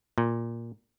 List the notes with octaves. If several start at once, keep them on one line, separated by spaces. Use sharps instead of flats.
A#2